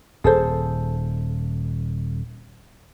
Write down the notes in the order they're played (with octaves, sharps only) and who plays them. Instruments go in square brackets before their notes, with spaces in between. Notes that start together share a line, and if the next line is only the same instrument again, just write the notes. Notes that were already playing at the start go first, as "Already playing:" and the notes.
[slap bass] D#1 [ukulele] G#4 A4 C5